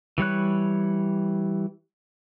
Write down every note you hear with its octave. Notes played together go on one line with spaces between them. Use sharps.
E3 G3 C#5 F#6